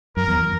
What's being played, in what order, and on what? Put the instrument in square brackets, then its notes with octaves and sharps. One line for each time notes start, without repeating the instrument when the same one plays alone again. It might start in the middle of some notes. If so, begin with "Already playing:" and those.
[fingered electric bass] F#2 [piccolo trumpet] A#4
[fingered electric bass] E2